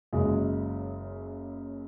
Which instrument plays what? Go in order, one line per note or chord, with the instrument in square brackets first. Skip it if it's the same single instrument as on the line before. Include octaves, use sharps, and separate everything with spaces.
[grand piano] F#1 F#2 C#3 G#3